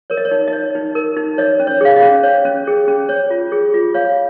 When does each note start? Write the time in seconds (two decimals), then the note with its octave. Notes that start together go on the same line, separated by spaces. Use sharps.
0.10 A#4 C#5
0.17 D#5
0.25 C#5
0.31 D#4
0.48 D#5
0.53 C#5
0.75 D#4
0.95 A#4
1.17 D#4
1.38 C#5 D#5
1.60 C#4
1.67 C#5
1.81 G#4 F5
1.96 D#5
2.03 C#4
2.23 C#5
2.45 C#4
2.67 G#4
2.88 C#4
3.09 C#5
3.30 F4
3.52 G#4
3.74 F4
3.94 C#5 F5